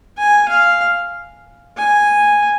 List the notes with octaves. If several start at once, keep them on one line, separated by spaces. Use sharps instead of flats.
G#5
F5
G#5